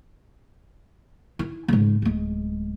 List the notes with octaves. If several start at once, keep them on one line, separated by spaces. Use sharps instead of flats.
E4
G#2 C#3
D1 G#3